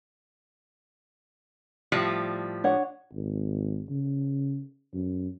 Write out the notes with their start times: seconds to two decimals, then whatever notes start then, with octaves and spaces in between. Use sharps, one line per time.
1.92 A2 F3 G3
2.64 D4 C#5 F#5
3.13 G#1
3.90 C#3
4.94 F#2